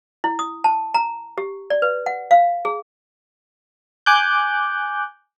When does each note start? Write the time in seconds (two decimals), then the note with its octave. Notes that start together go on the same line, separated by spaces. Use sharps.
0.24 E4
0.39 D#6
0.64 A5
0.94 A#5
1.38 G4
1.70 D5
1.82 B4
2.06 F#5
2.31 F5
2.65 G#4
4.06 G#5 D6 F#6 G6